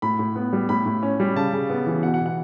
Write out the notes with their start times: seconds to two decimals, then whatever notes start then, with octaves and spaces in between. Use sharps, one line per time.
0.02 A2 B5
0.19 A2
0.36 B3
0.53 G3
0.69 A2 B5
0.86 A2
1.03 C#4
1.20 G3
1.36 C#3 A5
1.53 C#3
1.70 B3
1.86 E3
2.03 B2 F#5
2.14 F#5
2.20 B2
2.26 F#5